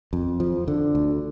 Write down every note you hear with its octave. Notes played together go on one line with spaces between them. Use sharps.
F2
F3
D3
D2